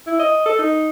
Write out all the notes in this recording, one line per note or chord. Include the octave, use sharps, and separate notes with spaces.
E4
D#5
A4
D#4